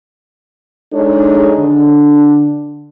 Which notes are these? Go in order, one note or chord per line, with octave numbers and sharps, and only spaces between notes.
G#3 D4 D#4 G#4 A4 C#5
D3 D4